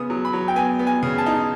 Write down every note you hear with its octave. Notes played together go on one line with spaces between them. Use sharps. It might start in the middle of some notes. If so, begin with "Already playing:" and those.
Already playing: C#3 B3 D#6
F#3
B5
F#3
G5
B3 G#5
B3
G#5
C#3
A5
D#4